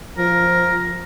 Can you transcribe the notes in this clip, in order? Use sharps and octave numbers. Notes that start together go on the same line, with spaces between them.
F3 A#4